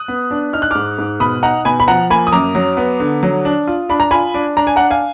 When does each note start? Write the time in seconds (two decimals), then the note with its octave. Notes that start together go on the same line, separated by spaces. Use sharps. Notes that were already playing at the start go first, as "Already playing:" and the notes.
Already playing: D#6 F#6
0.08 B3
0.31 D4
0.53 D#4 F6
0.62 F#6
0.71 G#2 D6 F6
0.98 G#2
1.20 B2 B5 D#6
1.43 D#4 F#5 A#5
1.65 B2 G#5 B5
1.80 B5
1.87 F3 F#5 A#5
2.10 A#3 G#5 B5
2.27 D#6
2.32 F#2 A#5 D6
2.55 F#3
2.77 B3
3.00 D3
3.23 F#3
3.45 D4
3.67 F4
3.89 D4 B5
4.00 A#5
4.11 F4 G#5 B5
4.34 D4
4.57 D4 A#5
4.67 G#5
4.76 D4 F#5 A#5
4.91 F5 G#5